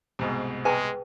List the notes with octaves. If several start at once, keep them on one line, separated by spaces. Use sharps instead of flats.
C2 G#2 B2
G#3 G#4 B4 G5 G#5